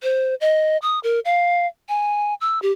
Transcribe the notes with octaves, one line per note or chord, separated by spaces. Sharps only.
C5
D#5
D#6
A#4
F5
G#5
E6
G4